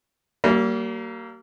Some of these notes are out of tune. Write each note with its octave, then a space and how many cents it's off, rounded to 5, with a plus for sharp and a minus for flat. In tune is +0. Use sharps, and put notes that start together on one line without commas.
G3 -45 A#3 -15